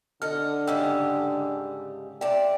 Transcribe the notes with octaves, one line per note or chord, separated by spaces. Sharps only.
D3 A4 D#5 F6
G#2 C#3 G3 G5 E6
C3 D5 G5 A5